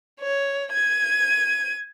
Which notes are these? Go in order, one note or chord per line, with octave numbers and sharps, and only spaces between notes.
C#5
G#6 D#7